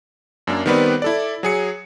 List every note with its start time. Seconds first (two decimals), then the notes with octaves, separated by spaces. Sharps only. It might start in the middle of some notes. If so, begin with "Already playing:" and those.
0.47 F#2 A#3 D4
0.66 D#3 G3 B3 C4 B4 D5
1.02 E4 A4 D5
1.43 F#3 G#4 C#7